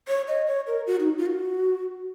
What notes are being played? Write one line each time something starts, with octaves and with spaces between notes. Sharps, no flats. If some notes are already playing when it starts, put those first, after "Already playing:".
C#5
D#5
C#5
A#4
F#4
D#4
F4
F#4